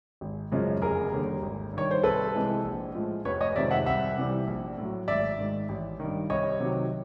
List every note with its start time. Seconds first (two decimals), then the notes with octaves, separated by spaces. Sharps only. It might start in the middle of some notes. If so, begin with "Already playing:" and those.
0.21 G#1
0.52 F#2 C#3 F3 G#3
0.82 F1 G#4 A#4
1.12 D#2 D3 G3
1.43 G#1
1.73 G2 D#3 C#5
1.91 C5
2.03 C2 A4 B4
2.35 C3 E3 G#3
2.64 A#1
2.95 A2 F3 G#3
3.25 F1 B4 C#5
3.41 C#5 D#5
3.56 F2 C3 D#3 G#3 D5 E5
3.71 E5 F#5
3.86 C2 E5 F#5
4.17 C3 E3 G3
4.47 A#1
4.77 A2 F#3
5.08 G#1 D5 E5
5.38 G#2 D#3
5.69 A1
6.00 G2 D#3
6.30 C2 C#5 D#5
6.60 C3 D#3 F#3